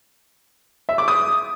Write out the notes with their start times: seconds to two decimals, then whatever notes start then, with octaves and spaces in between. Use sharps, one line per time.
0.89 E5
0.98 D6
1.08 D#6